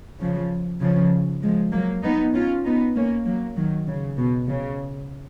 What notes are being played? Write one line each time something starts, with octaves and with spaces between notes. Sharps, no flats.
C#3 F3
C#3 F3
F3 G#3
F#3 A#3
B3 D#4
C#4 F4
B3 D#4
A#3 C#4
F#3 A#3
D#3 F#3
C#3
B2
C#3